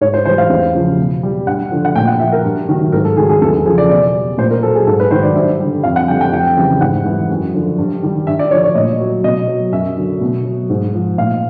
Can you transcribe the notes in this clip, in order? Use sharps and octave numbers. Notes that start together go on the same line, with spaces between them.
G#2 C#5
C5
E3 G3 C5
F5
E2
C#3 F3
B2
G3
G2 F#5
D3 F3
F#5
A#2 G5
F#5
F3 E5
A#4
G2
D#3 F#3
G#2 A#4
A4
D#3 F#3 G#4
G#4
E2 A4
A4
C#3 F3 G#4
D5
B2 D5
G3
A#2 C5
A#4
F#3 A4
G#4
G#2 A4
B4
D#3 F#3 C5
D5
G2 E5
D3 G3
F2 F5
F#5
D3 G3 G5
G5
F2 G5
C#3 E3 G3
G#2 F#5
E3 G3
F#2
D3 F3
G2
D#3 G3
G2 E5
D5
D3 F3 C#5
C#5
A#2 D#5
F#3
B2 D#5
F#3
F#2 E5
D3 F#3
B2
F#3
G#2
F3
A#2 F5